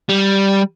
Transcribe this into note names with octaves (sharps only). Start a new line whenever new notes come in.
G3